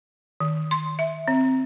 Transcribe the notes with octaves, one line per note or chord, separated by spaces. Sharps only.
D#3
C6
E5
C4